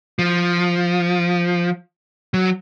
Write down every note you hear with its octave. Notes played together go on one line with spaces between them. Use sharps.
F3
F#3